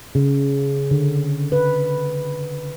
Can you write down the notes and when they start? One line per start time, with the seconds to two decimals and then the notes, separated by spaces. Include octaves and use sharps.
0.15 C#3
0.91 D3
1.52 B4